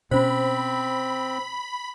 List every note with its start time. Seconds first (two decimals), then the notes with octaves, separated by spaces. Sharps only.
0.11 B2 C4 C#4 C5 B5